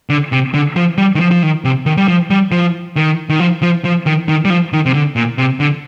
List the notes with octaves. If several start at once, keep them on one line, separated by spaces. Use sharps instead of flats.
D3
C3
D3
F3
G3
D#3
F3
F3
D#3
C3
D#3
G3
F3
G3
F3
D#3
D#3
F3
F3
F3
D#3
D#3
G3
F3
D#3
C3
D3
A#2
C3
D3